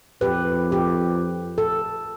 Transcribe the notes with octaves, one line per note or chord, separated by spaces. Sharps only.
F2 G4 B4
G4
A4